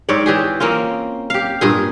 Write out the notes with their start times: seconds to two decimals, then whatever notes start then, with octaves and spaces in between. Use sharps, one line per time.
0.09 G#2 C4 C#5 D5
0.26 E3 G4 G#4
0.60 A#3 C4 C#4 F4
1.30 G4 F5
1.61 G2 A#2 G#4